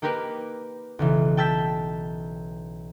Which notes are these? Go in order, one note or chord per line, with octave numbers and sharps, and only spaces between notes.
A#3 D#4 G4 A#4 B4
B1 C#3 E3
G5 A5 E6 G6 B6